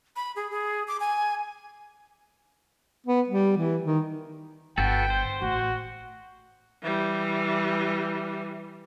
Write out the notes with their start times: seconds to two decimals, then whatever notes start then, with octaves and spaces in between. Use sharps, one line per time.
0.16 B5
0.36 G#4
0.51 G#4
0.88 D6
1.00 G#5
3.06 B3
3.28 G3
3.57 E3
3.84 D#3
4.78 G1 B3 F#4 A4 G5
5.10 C5
5.42 A1 F#4
6.82 E3 G3